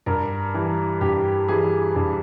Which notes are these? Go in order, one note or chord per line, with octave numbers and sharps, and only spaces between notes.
G2 A#4
E3 G3
G2 G4
E3 G3 G#4
G2